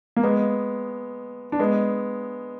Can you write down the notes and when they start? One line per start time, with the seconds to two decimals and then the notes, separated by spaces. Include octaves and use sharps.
0.17 A#3
0.23 G#3 B3
1.52 D4
1.59 G#3 B3